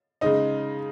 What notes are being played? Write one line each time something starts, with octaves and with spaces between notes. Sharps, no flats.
C#3 G#3 D#4 D#5